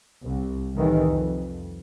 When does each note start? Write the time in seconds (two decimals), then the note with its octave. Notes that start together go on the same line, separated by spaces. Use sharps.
0.25 C2
0.74 C2 A2 D#3 E3
1.07 F2